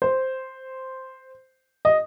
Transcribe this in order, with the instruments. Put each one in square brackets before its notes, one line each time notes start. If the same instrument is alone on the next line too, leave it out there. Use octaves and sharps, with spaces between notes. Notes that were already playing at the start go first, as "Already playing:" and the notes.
[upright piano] C5
D#5